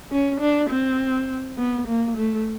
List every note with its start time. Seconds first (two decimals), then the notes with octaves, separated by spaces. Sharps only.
0.11 C#4
0.40 D4
0.70 C4
1.58 B3
1.88 A#3
2.17 A3